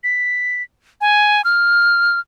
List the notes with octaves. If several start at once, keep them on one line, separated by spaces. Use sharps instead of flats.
B6
G#5
F6